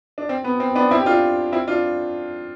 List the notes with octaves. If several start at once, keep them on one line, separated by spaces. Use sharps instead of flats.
D4
C4
B3
C4
B3 D4
C4 E4
G4
D4 F4
C4 E4
D4 F4